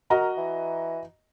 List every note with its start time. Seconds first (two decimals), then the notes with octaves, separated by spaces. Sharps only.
0.10 F#4 A#4 D#5 A#5
0.37 E3